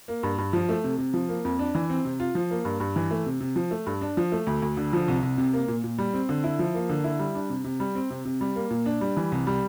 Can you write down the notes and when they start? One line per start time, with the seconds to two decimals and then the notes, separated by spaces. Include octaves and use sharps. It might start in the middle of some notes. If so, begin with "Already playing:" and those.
0.08 A#3
0.23 G2
0.38 G2
0.53 F3
0.69 A3
0.84 C3
0.98 C3
1.14 F3
1.29 A#3
1.45 F2
1.59 D4
1.75 E3
1.90 C4
2.05 C3
2.20 F4
2.35 F3
2.51 A#3
2.65 G2
2.80 G2
2.96 E3
3.11 A3
3.26 C3
3.40 C3
3.56 F3
3.71 A3
3.86 G2
4.02 D4
4.17 F3
4.32 A3
4.47 D2
4.62 D2
4.77 D3
4.93 F3
5.08 C2
5.23 C2
5.38 C3
5.53 A#3
5.68 A#2
5.84 A#2
5.98 G3
6.13 C4
6.29 D3
6.44 E4
6.59 F3
6.74 A#3
6.89 D3
7.04 E4
7.19 G3
7.35 D4
7.50 C3
7.64 C3
7.80 G3
7.95 C4
8.10 C3
8.25 C3
8.41 G3
8.56 A#3
8.70 A#2
8.86 D4
9.01 G3
9.17 E3
9.32 C2
9.47 G3